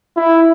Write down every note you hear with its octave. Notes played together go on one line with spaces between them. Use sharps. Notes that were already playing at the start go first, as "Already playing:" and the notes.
E4